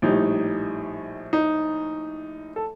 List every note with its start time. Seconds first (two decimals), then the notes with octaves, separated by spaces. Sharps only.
0.02 A#1 A2 G3 D#4
1.33 D#4
2.56 A4